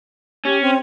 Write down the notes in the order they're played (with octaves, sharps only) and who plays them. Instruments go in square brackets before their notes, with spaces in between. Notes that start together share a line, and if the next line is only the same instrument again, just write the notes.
[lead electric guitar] C#4 [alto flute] G4
[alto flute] C4